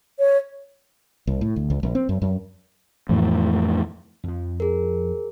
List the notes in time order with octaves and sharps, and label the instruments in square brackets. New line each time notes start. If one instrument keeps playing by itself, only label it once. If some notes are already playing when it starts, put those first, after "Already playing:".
[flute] C#5
[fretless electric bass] C2
A2
D2
C#2
A#1
C4
F#2
F#2
[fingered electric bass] F2 A2 E3
[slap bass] F2 F3
[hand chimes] G#4 A#4